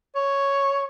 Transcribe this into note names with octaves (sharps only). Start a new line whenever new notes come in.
C#5